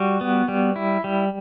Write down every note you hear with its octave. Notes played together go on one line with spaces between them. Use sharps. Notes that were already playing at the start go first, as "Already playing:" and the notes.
Already playing: G3 F#4
B3
G3
E4
G3